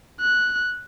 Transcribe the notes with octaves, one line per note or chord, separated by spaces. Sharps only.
F#6